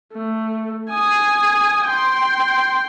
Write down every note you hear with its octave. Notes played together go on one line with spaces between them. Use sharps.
A3
G#5 D#6
G5 C6